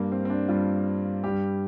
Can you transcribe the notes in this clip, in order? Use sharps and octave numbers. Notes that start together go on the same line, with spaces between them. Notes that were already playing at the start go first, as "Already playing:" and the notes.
Already playing: G2 G3 A#3
C4
C4
D4
G2 G3 F4
G2 G3 G4